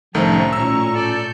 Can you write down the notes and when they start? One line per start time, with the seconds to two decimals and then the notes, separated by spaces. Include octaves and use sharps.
0.15 C2 A2 D#3 F3 A3 C#4 A#5 C#6
0.53 A#2 E6
0.95 A4 D5 G6